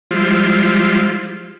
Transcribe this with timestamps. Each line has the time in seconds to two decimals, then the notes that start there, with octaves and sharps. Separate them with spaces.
0.11 F3 G3 G#3 E4 F4 C5